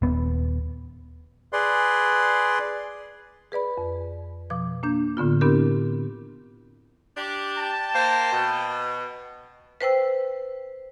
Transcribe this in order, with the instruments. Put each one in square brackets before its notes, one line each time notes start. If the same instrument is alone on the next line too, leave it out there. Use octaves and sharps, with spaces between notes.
[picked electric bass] D#1 B3
[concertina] G#4 B4 D5 C6
[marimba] G#4 B4 D5 B5
F2
B2 F3 D6
A#3 D4 G6
A2 D3 B3 F4
B3 C4 D4 E4 G4 A#4
[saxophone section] D4 G4
[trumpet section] G5 A5
[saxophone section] A#3 C5
B2
[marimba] B4 C5 G5 E6